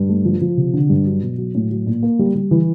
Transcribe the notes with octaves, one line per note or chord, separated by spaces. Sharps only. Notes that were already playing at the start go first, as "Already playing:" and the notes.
Already playing: G2
A3
F3
F3
C3
D3
G2
F#3
B2
F#3
A2
F#3
A#2
A#3
G3
G3
E3